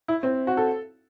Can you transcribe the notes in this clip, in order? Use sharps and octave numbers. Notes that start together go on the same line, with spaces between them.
E4
C4
F#4
A4